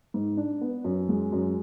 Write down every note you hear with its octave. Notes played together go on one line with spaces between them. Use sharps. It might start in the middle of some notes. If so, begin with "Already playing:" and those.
G#2
D4
B3
F#2
G#3
F#2